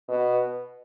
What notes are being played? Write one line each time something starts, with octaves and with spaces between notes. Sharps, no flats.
B2